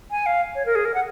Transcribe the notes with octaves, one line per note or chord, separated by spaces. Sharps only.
G#5
F5
C#5
A#4
G#4
A#4
F#5